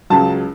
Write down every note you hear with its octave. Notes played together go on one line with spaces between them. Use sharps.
C#2 C#3 F#3 A5